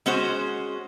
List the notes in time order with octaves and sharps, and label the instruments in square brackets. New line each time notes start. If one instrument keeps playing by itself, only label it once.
[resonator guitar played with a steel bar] G#3 C#4 F#4 C5